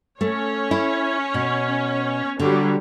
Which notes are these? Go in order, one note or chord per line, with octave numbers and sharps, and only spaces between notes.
A3 C#4 C#5
E4
B2
D3 F#3 G3